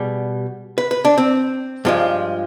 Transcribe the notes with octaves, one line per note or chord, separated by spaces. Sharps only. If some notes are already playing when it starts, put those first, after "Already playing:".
Already playing: B2 G3 G#4
B4
B4
D4
C4
G2 F3 G#3